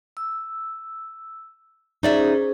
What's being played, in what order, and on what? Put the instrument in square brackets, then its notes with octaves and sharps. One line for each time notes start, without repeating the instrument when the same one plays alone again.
[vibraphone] E6
[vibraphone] C#4 G#4 C5 [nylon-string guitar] D#4 D5 E5